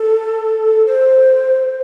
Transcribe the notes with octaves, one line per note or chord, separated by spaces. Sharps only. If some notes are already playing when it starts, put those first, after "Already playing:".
Already playing: A4
C5